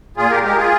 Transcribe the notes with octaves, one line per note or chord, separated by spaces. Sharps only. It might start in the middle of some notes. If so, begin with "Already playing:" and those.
A#2 F4 G#4
G4 A#4
G#3 G4 A#4
F4 G#4